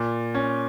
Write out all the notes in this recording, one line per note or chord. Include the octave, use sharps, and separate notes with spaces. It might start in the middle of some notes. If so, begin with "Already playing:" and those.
Already playing: A#2
C#4